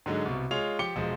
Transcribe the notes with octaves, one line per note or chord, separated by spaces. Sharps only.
G#2 D3 F#3 G#3
C2 B2
G#3 F4 G#4 C#5 F7
F3 G4 D6 C#7 G7
E1 F3 G#3